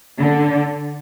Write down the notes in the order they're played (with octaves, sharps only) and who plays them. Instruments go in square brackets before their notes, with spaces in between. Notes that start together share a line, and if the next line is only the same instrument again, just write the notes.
[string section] D3